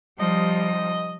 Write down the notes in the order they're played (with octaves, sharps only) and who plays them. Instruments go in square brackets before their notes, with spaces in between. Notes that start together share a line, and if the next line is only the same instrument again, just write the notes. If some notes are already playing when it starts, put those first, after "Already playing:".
[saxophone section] C3 D#4 D#5 [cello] F3 G3